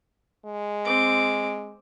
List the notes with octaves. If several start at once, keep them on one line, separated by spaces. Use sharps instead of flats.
G#3
C4 D6